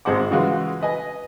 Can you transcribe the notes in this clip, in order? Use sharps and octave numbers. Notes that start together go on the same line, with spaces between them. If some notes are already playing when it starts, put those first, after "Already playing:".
G#1 G#3 C5 F#5 D6
C#3 E3 G#3 F4 F#4
B4 D#5 G#5